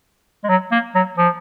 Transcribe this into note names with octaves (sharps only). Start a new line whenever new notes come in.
G#3
F#3
A#3
F#3
F3